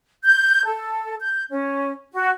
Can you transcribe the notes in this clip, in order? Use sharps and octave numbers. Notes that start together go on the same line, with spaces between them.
G6
A4
G6
C#4
F#4